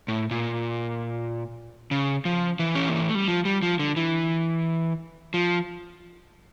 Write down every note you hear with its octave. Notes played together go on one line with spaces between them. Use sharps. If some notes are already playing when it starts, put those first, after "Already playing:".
A2
A#2
C#3
F3
E3
C#4
A#3
A3
G3
F3
G3
F3
D3
E3
F3